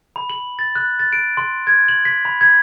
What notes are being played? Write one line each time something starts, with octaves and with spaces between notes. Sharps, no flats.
B5
F#7
A6
F#6
A6
D7
C6
G#6
F#7
B6
B5
G#6